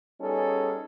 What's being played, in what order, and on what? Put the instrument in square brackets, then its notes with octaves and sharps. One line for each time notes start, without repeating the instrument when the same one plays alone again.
[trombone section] G3 B3 C#4 D#4 G#4 A4